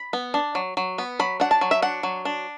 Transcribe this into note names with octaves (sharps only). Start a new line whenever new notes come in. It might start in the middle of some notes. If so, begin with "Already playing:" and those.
Already playing: B5
B3
D4
F#3
F#3
B3
F#3 B5
D4 F#5
A5
F#3
E5
D4 F#5
F#3
D4